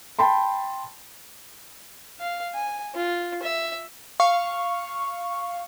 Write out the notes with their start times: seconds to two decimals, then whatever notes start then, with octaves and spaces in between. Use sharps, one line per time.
0.19 G5 A5 B5 C6
2.20 F5
2.54 G#5
2.95 F4
3.42 E5
4.20 F5 C#6